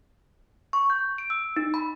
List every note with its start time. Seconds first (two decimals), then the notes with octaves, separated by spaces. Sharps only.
0.73 C#6
0.90 G6
1.18 D7
1.30 E6
1.56 D#4
1.74 B5